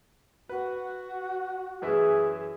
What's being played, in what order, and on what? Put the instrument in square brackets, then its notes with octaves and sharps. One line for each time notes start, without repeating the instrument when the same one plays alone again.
[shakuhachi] F#4 [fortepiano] B4
[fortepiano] F#2 E3 E5 [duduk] G#4